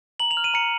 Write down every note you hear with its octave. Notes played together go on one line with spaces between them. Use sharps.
A#5 F#7
F7
F6
D#7
A#5 C#7